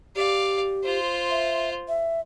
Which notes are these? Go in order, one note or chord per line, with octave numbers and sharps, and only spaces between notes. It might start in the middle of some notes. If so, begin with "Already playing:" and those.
G4 D5 F5
F4 C5
E5
E5